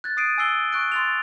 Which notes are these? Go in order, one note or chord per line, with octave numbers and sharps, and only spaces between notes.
F#6 G#6 A6
D#6 A6 C7 D7 D#7
G#5 E6 C7 G7
C#6 F#6 D7
C6 A6 F7